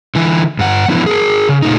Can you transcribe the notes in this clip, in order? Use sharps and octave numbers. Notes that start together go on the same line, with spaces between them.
D3 E3 E4
G2 F#5
E3 F3 B3 D4 E4
G#4 A#4
C#3
A#2 A3 D#4